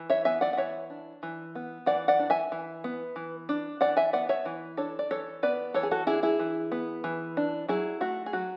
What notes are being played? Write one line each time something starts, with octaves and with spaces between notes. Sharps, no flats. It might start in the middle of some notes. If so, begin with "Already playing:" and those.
Already playing: E3
C#5 E5
B3 E5 G#5
D5 F#5
F#5
E3 C#5 E5
D4
E3
B3
E3 D5 F#5
D5 F#5
D4
E5 G#5
E3
B3
E3
D4
E3 D5 F#5
E5 G#5
B3 D5 F#5
C#5 E5
E3
D4 A4 C#5
D5
E3 A4 C#5
B3 B4 D5
E3 A4 C#5
G#4
F#4 A4
D4 E4 G#4
E4 G#4
E3
B3
E3
D4
F#3 E4 G#4
A3 F#4
G#4
F#3 F#4